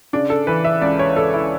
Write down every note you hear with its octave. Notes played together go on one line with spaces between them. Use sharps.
C#3 D4
A4
E3 B4
E5
C#2 D5
C#5
C#2 A4
E4